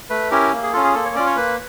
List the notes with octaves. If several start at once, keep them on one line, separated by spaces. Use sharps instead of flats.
A3 B4
C#4 E4 G4 A#4
A#3
G#4
C#4 F4 A4
G#4
A#3 A4
C#5
C#4 F4 D5
C#5
A#3 B4